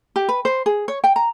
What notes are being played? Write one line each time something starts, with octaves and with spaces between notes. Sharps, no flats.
G4
B4
C5
G#4
C#5
G5
A#5